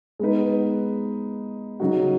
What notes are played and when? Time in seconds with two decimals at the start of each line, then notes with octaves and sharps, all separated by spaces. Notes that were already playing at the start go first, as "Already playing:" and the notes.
0.19 G#3 B3 D#4 B4
1.80 C#3 F#3 D#4 F#4